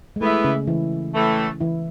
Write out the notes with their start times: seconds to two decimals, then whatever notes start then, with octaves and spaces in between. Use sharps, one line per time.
0.16 G#3
0.21 E3 A3 B3 E4
0.44 C#3 C#4
0.67 E3 E4
1.15 A2 E3 A3
1.60 E3 E4